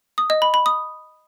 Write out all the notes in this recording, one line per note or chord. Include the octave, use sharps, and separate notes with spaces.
D#6
D#5
B5
B5
D#6